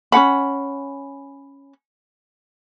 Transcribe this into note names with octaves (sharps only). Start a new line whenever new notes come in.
C#4 F#4 F#5 B5